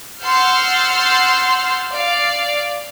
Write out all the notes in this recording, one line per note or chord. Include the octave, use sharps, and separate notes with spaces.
F#5 C6 E6 F6 G6 A6
D5 F5